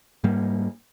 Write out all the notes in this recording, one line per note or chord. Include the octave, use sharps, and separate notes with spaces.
G#2 G3 A#3